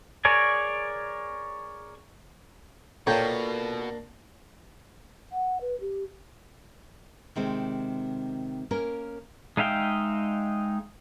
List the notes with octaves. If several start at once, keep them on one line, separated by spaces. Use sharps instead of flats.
G#4 A#4 C#5 D5 G#5
B2 A#3 D4 F4 A4 A#4 C#5 G5
F#5
B4
G4
C3 D#3 G#3 C4
A#3 C#4 A#4
G#3 D#4 E5 F5 G5